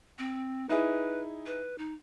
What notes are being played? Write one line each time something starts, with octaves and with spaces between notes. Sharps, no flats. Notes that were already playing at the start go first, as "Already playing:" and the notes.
C4
D#4 E4 G#4 B4
B4
D#4